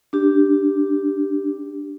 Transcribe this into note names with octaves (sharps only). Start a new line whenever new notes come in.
D4 G4